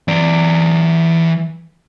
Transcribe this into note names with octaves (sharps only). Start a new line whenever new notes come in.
E3 D5